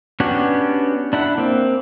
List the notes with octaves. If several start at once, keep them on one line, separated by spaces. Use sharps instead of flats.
B3 C#4 D4 F#4 G4
D4 E4 F#5
A#3 C4